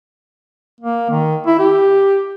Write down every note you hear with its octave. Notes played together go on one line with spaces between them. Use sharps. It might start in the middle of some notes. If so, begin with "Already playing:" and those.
A#3
D#3
E4
G4